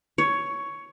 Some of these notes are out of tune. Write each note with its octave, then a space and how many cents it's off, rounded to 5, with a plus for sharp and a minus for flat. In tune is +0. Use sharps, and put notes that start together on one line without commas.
C#5 +10